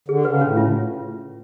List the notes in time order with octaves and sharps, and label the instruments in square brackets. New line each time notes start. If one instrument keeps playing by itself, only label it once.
[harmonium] D3 [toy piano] G#4
[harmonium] C#3 [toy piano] B4
[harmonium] A2 [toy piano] C#4
[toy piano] F4